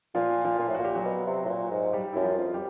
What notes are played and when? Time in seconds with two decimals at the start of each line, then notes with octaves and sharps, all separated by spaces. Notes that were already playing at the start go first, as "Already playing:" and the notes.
0.15 A#2 F3 F4
0.45 F3 F4
0.59 A#2
0.68 A2
0.75 A#2 F#4
0.85 G4
0.95 F#3 F#4
1.05 B2
1.26 C3
1.45 A2
1.49 A#2
1.71 G#2
1.93 G3 G4
2.13 F#2 E4
2.24 F3 F4
2.38 F2
2.54 G3 G4